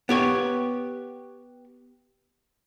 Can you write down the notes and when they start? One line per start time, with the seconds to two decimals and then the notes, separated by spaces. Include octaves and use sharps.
0.09 B3 G4 C#5